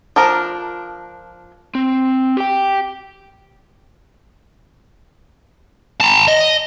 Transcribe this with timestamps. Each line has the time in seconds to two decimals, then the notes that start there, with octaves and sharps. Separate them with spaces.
0.16 F3 D4 A#4
1.75 C4
2.37 G4 G5
6.00 A5 A#5
6.28 D#5